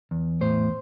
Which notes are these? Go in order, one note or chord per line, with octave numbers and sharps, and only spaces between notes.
E2
A2 C5